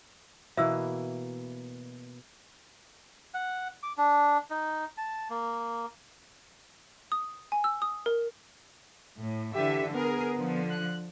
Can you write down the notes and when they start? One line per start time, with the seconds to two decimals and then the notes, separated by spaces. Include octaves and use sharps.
0.57 B2 E3 A#3 E5 E6
3.34 F#5
3.83 D6
3.98 D4
4.51 D#4
4.98 A5
5.30 A#3
7.12 D#6
7.52 G#5
7.64 E6
7.82 D#6
8.06 A#4
9.20 A2
9.54 D3 E3 G4 E5
9.94 B3 G#4 A#4
10.35 D3 F3
10.70 F#6